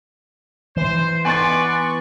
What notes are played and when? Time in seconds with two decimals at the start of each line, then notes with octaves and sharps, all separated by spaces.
0.77 E3 C5
1.25 B3 B4 D5 G#5 C6 C#6 A6